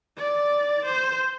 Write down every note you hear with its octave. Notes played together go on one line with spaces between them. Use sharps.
D5
C5